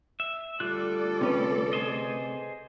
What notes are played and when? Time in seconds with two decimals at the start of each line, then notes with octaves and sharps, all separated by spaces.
0.20 E5
0.60 D2 G3 F4 A4 D5 F#6
1.21 C3 C#4 B4
1.73 G#4 C5 D#5